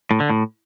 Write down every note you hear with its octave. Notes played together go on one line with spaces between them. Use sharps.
A2
D3
A2